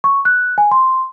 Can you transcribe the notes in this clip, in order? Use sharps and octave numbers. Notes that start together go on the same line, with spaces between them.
C#6
F#6
G#5
C6